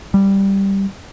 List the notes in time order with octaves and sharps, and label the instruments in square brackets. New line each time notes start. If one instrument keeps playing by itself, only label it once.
[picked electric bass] G3